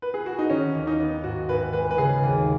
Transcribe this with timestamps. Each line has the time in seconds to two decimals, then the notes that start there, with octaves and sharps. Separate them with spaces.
0.02 B4
0.14 G#4
0.26 F#4
0.39 D#4
0.50 D#3 C#4
0.75 D#2
0.87 D#4
1.00 B3
1.24 G#2 F#4
1.49 G#1 B4
1.73 G#3 B4
1.91 B4
1.98 C#3 G#4
2.23 D#2